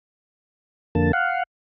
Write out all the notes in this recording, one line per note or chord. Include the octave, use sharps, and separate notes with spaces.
F2 D3 A#3 A5
F5 F#5